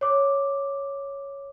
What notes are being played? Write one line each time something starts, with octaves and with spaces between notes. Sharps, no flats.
C#5 D6